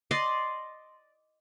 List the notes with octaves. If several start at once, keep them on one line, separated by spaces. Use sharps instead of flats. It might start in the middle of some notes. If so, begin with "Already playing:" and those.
D5 D#5 C6